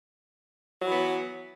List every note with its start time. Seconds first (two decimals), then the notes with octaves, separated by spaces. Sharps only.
0.82 F#3
0.87 E3
0.92 B3